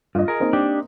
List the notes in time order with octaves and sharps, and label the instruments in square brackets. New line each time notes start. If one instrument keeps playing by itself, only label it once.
[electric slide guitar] G2 [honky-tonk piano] F4 D#5
[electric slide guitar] G#4 A#4
[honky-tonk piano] A#3 C4 D#4
[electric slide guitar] D4 G4